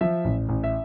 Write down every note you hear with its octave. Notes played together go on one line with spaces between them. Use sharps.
F3 E5
A1
A1
E5